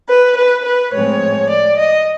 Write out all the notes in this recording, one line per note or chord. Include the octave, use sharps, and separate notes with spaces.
B4
B4
B4
A2 F3 G#3 C4 C#5
D5
D#5